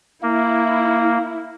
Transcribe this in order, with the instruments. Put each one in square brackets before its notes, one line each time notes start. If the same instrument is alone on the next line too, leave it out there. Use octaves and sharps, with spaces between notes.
[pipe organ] A#3 [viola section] E4